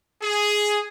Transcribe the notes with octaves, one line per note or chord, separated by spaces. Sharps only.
G#4